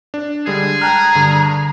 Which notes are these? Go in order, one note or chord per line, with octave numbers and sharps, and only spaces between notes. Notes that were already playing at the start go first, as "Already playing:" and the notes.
D4
D3 G3 G#3 G#4
G5 A5 A#5 F6 F#6
G2 D3